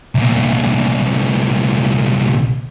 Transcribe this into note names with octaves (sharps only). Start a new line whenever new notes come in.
C2 A#2